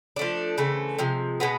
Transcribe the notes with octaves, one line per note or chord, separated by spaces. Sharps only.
F3 A3 D4
C#3 E3 A3 C4
C3 F3 G#3
B2 G#3 B3